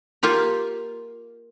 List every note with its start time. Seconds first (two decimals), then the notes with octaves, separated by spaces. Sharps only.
0.23 A#3 F4 G4 A#4